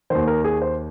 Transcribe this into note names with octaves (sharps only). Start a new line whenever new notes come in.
D#2 D#3 C5
A#4
G#4
C5